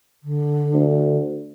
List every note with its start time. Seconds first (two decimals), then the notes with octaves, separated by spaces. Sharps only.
0.23 D3
0.74 D2